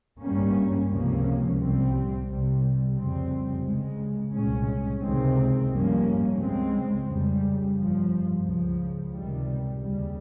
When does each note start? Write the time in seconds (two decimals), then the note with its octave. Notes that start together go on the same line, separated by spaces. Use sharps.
0.21 G#1 G2 G3 A#3 C#4
0.89 C#2 C3 F3 A#3 C#4
1.58 C2 C3 G3 C4
2.27 C2 C3 G3
2.96 F1 F2 C#3 G3 C4
3.64 C#2 C#3 G#3
4.33 C2 A#2 G#3 C#4
5.02 C#2 C3 D#3 G#3 C4
5.70 G1 G2 F3 A#3 C#4
6.39 C#2 C#3 G#3 C4
7.08 F2 C#3 G3
7.77 G1 G2 F3
8.45 C#2 C#3 F3
9.15 C#2 C3 D#3 G3
9.83 D#2 C#3 G3